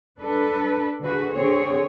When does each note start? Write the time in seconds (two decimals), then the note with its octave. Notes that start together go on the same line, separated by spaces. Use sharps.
0.19 D4 A4 B4
1.02 D3 F#4 G#4 B4
1.34 D3 C4 G#4 C#5